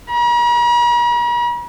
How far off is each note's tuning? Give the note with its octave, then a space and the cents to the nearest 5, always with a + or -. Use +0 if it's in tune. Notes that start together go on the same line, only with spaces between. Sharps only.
A#5 +45